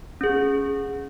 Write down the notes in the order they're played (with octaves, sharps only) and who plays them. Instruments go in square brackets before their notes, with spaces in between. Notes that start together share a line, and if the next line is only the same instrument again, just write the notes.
[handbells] C#4 G#4